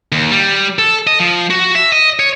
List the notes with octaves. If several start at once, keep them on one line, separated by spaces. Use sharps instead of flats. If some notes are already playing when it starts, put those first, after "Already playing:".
D#2
G3
A4
D#5
F3
F#4
E5
D#5
C#5